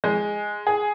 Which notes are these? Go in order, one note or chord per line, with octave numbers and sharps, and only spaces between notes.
G#3
G#4